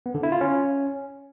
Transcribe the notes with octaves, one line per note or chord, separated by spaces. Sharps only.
B3
D3
E4
F4
C#4